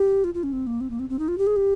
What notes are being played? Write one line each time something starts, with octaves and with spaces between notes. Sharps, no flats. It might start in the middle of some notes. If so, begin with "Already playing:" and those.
Already playing: G4
F4
F4
C#4
C4
A#3
C4
A#3
C4
C4
D#4
F4
G4
G#4
G4